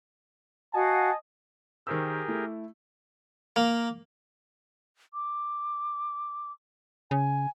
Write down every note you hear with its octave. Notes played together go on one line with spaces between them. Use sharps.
F#4 D#5 F5 F#5 G#5 A5
D#3 G4 G#4 A#4 C5 E6
A3 E4
A#3
D6
C#3 G#5